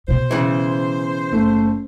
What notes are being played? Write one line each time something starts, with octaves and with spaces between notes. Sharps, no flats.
B2 C5
C#3 E3
F#1 A3